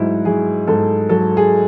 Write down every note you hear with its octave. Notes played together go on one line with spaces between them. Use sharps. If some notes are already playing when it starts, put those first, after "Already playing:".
Already playing: G#2 F#3 E4
F#3 G#4
G#2 A4
F#3 A4
G#4